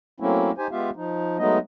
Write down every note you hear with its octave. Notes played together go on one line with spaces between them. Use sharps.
F#3 A3 A#3 C4 C#4 E4
D#4 G4 C5 G#5
G#3 B3 F4 G4 E5 F5
F3 D#4
F#3 G#3 A3 B3 D#4 D#5